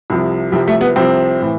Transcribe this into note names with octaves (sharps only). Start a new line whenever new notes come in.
C2 C3 F3
C2 C3 F3 G3
A3
B3
C2 C3 F3 C4
A2 E3